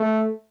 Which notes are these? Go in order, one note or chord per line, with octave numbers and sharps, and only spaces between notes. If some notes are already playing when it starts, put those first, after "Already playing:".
Already playing: A3